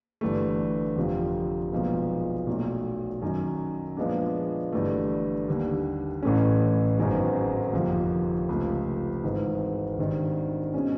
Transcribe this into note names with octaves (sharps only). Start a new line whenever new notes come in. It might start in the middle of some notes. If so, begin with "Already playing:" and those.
G1 G2 E3 A3
G1 F2 C3 F3
B1 A#2 F3 G#3 B3
B1 A#2 F#3 A3
F#2 D#3 F#3
A#2 F3 G#3 B3 D4
G1 G2 E3 A3
D#2 D3 G3
A1 A2 E3 A3 C#4
G#1 F#2 D#3 G#3 B3
G1 F2 C3 F3 A#3
C#2 C3 F3 A3
G#1 G#2 E3 G#3
G#1 G2 D#3
B2 G#3 C#4